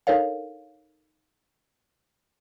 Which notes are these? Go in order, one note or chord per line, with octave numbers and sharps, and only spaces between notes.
D4 D#4 A4 A#4 C#5 F5